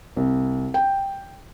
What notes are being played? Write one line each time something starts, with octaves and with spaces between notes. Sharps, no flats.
C2
G5